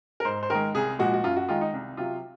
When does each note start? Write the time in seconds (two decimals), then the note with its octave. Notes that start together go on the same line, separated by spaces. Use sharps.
0.20 A#4
0.25 G#2 C5
0.43 C5
0.50 D#3 G#3 A#4
0.75 C2 G#4
0.99 A#2 F3 G#3 F#4
1.14 F#4
1.24 F#2 F4
1.36 F#4
1.48 D#3 G#3 F4
1.61 D#4
1.73 C2
1.97 C3 F#3 F4